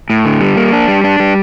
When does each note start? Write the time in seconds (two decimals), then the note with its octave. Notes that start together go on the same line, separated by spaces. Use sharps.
0.10 A2
0.25 D3
0.41 G3
0.57 A#3
0.72 D4
0.88 G3
1.04 D4
1.20 G3